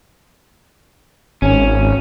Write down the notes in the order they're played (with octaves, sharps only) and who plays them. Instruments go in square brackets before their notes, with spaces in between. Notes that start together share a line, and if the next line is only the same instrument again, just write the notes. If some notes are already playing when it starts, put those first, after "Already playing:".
[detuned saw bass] G#1 [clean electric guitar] C#4